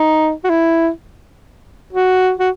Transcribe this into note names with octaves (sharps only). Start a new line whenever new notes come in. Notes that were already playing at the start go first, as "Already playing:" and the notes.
Already playing: D#4
F#4
E4
F#4
F#4